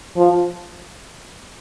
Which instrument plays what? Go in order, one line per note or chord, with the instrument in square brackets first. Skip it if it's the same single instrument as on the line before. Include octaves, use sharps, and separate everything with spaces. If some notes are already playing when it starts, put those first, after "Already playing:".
[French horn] F3